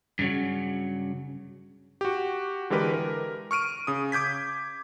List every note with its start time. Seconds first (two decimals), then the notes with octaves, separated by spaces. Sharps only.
0.19 G2 C#3 F3 F#3
2.01 F#4 G4
2.70 D3 E3 G#3 G4 A#4 B4
2.93 A#4
3.51 C#6 F6 D7 D#7
3.87 C#3 D#6
4.12 D6 G6 G#6 B6